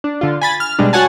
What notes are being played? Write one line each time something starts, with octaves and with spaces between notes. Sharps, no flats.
D4
D3 F4
G#5 B5 A6
F6
B2 G3 G#3 D4
F#4 C#5 F#5 G#5 A5